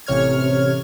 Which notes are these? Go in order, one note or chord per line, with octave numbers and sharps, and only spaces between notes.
A1 C3 C#5 F6 G#6